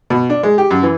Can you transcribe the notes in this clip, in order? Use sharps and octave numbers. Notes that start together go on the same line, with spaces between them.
B2
D4
G#3
G4
F#2
E3